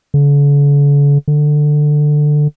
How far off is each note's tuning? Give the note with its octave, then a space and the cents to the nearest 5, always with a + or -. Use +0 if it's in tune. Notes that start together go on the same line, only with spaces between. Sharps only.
D3 -45
D3 +15